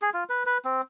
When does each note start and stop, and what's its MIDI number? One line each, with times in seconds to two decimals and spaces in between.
0.02 0.10 68
0.14 0.24 65
0.29 0.43 71
0.46 0.58 71
0.65 0.81 60